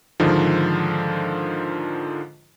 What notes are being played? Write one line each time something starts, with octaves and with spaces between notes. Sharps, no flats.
G#2 D3 D#3 F3